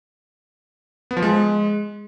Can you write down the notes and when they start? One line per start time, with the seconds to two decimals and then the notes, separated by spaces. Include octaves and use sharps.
1.11 B3
1.17 F3
1.22 G#3